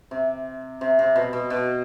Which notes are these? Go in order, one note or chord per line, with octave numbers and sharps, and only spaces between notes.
C3
C3
C3
B2
B2
B2